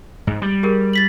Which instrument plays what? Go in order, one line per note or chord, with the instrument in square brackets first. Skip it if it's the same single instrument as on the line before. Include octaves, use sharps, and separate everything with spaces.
[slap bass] G#2
G3
[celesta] G4 G#4 A#4
A6 B6 F#7